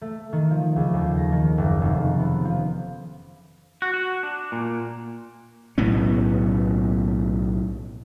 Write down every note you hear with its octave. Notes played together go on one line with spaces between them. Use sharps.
A3
D#3
F3
C#2
D#2
A#6
D#3
F#1
F1
B3
F3
F#4
F#4
D4
A#2
B1 A2 B3 C#4